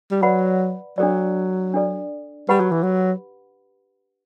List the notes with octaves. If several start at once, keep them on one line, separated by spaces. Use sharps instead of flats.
G3
F#3 B4 D5 F#5 B5
F#3 D4 A4 D5
D4 A4 D5
G3 G4 B4 F#5 B5
F#3
E3
F#3